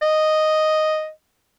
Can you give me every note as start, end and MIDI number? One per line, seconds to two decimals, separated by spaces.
0.02 1.10 75